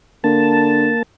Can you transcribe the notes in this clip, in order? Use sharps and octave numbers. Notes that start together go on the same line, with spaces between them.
D3 A#3 A5